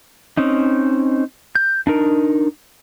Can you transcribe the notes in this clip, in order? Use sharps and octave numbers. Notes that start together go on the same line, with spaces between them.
C4 C#4 D#4
G6
D4 D#4 A#4